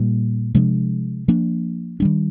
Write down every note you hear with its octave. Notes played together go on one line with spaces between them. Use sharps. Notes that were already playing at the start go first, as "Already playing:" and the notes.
Already playing: A#2 G3 A#3
C3 F3 G#3 D4
F3 A#3 D4
D#3 G3 D4